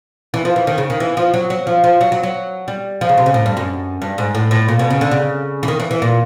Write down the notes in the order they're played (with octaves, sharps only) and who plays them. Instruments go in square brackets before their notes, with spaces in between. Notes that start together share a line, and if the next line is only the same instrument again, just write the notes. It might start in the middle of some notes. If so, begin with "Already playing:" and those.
[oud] E3
F3
E3
D#3
C#3
D#3
E3
F3
F#3
F#3
F3
F3
F#3
F#3
F#3
G3
F3
C#3
C3
C#3
A2
G2
F#2
G2
G#2
A2
A2
A#2
B2
C#3
D3
C#3
E3
D#3
E3
E3
A#2